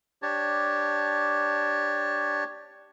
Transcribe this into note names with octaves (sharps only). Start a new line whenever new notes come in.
D4 G4 C#5 A5